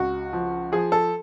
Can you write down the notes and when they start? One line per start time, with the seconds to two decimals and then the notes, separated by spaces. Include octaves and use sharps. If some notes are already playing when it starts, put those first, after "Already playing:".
Already playing: C#2 F#4
0.33 F3
0.72 F3 G#4
0.92 A4